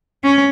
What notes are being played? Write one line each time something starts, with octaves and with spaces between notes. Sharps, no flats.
C#4